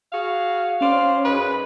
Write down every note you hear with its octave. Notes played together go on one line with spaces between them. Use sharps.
F#4 G#4 F5
C#4 C5 D5 F5
F#2 D#4 G#4 B4